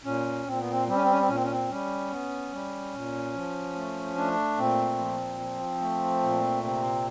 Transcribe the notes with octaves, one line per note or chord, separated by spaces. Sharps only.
A#2 C#4
A#2 C4
B3
C4
G3 C4
C#4
C4
C#4
C4
A#2 C#4
C4
C#4
C4
G3 C#4
B3
G3
A#2
F3
A3
A3 D4
A#2 C4
F3
F3
A3
A#2
C3 C4